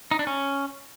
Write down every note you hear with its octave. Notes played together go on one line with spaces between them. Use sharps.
D#4
D4
C#4